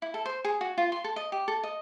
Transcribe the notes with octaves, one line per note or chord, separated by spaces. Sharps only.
E4
A4
C5
G#4
F#4
F4
C6
A4
D#5
G4
A4
D#5